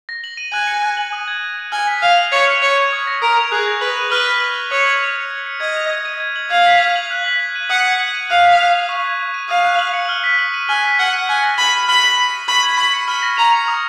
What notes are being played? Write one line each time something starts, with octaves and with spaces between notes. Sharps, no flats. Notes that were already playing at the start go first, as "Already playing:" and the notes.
A#6
F#7
D#7
G#5 F#6
C#7
F#6
F#7
D#6
G#6
F#7
D#7
G#5 F6
B6
F5 F6
F#7
C#5 C#6
F6
C#5 C#7
G#6
D#6
A#6
A#4 D#6
F7
G#4 F#6
A#6
B4 F#7
D#7
B4 F6
B6
F6
F#7
C#5 D#6
G#6
F7
C#7
G#6
C#7
D#5 G#6
F7
G#6
D#7
G#6
F#7
F5 G#6
B6
G#6
F#7
F#6
B6
F#7
D#7
F#5 D#6
G#6
F#7
D#7
F5 F#6
B6
F#6
F7
C#6
G#6
C#6
D#7
F5 D#6
F#6
F#7
C#7
F6
B6
F#7
D#7
G#5 F6
B6
F#5 F6
D#7
G#5 F6
A#6
B5 F#7
D#7
B5 F6
B6
F#7
D#7
B5 C#6
G#6
B5 C#6
C#7
B5 F6
A#6
A#5 F7
C#7
D#6